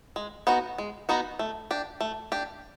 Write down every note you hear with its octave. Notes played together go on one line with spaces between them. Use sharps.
G#3
B3 D#4 F#4
G#3
B3 D#4 F#4
A3
D4 G4
A3
D4 G4